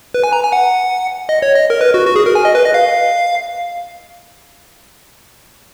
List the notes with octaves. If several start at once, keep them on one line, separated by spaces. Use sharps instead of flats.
B4
G#5
A#5
G#5
F#5
D#5
C#5
D#5
A#4
B4
F#4
F#4
G#4
A#4
G#5
D#5
B4
D#5
F5